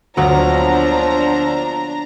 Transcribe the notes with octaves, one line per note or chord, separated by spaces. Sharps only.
D2 F3 F#3 A#3 B3 D4 A#5